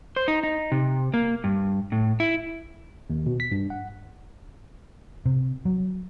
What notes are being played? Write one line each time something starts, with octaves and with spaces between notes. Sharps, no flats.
C5
D#4
D#4
C3
A#3
G2
A2
E4
D#2
B2
B6
G2
F#5
C3
F#3